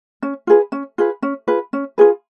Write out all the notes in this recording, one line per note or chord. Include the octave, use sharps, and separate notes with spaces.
C#4
F4 G#4 B4
C#4
F4 G#4 B4
C#4
F4 G#4 B4
C#4
F4 G#4 B4